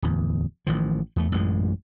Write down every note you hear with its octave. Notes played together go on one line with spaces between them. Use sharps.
D1 E2
A1 D#3 F3
E2 A3
A1 F#2 A#2 G#3